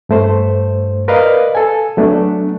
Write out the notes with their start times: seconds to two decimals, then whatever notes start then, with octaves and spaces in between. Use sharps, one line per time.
0.09 G2 A3 C5
1.08 A#4 B4 D5 D#5 F5
1.55 A4 G#5
1.97 F#3 A3 B3 D4